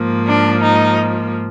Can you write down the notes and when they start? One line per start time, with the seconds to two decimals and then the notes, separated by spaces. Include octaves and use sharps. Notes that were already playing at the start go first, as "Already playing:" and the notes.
Already playing: G#2 F3 A#3
0.26 D4
0.62 D#4